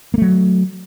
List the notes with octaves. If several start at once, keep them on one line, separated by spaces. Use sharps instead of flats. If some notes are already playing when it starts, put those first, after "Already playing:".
F#3 A3 A#3